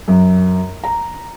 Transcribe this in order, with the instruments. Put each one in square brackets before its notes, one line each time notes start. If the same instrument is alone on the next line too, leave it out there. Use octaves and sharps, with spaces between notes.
[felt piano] F#2
A#5